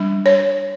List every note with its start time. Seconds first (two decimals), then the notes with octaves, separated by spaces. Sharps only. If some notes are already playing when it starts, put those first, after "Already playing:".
Already playing: G3 D4
0.26 C#5